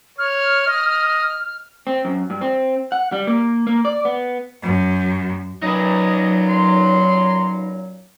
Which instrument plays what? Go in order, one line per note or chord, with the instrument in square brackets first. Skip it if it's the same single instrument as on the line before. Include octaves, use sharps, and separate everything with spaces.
[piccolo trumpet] C#5 [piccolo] F6
[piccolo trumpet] D#5
[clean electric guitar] C4
F#2
G2
C4
F#5
G3
A#3
A#3
D5
B3
[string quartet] F#2
[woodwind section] F#2 A#2 F#3 [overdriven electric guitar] D#4 B4 [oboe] D#5
[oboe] C6